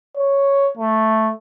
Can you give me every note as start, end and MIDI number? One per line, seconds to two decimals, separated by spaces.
0.17 0.71 73
0.78 1.32 57